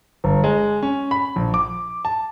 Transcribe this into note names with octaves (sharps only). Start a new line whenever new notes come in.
G1
G#3
C#4
B5
A#1
D6
A5